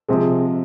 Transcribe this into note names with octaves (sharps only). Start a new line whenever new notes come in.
C3 F3 G#3